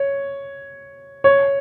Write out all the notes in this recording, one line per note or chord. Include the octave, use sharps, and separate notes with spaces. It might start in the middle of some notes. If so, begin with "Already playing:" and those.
Already playing: C#5
C#5